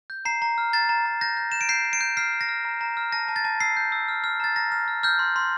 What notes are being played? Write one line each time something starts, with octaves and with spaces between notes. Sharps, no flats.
G6
A#5 C7
A#5
F6
A#5 A6
A#5
A#5
G6 A#6
G6
G6 E7
D7
G6 C7
G6
D7
G6
F6 C7
F6
A#6
F6
A#5
A#5
F6
A5 A#6
A5
A6
A5
E6 C7
G6
E6
F6
F6
A#5 A6
A#5 A#6
F6
F6
F6 G6
C6
C6